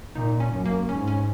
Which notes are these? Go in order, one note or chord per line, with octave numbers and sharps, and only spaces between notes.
A#2 D#4
C#4
F#2
A#3
G#2 C#4
C#4